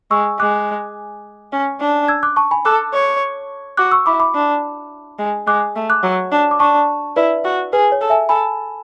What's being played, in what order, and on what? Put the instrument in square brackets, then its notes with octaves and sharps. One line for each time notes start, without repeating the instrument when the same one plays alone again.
[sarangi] G#3 [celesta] C#6 E6
[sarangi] G#3 [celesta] D6 F#6
[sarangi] C#4
D4
[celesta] E6 G#6
D6 F#6
A5 C#6
G#5 B5
[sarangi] A4 [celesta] D6 F#6
[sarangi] C#5
[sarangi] F#4 [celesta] D6 F#6
[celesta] C#6 E6
[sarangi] E4 [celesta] B5 D6
[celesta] B5 D6
[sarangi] D4
G#3
[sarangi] G#3 [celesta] D6 F#6
[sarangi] A3
[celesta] D6 F#6
[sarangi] F#3
D4
[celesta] D6
[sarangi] D4 [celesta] A5 C#6
[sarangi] E4 [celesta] B4 D5
[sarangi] F#4
[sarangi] G#4 [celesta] B4
[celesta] C#5
[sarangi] A4
[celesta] E5 G#5
[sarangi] A4 [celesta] G#5 B5